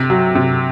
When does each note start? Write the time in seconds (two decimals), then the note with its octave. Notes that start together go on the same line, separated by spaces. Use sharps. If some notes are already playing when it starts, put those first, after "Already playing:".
Already playing: C3
0.10 F#3
0.35 C3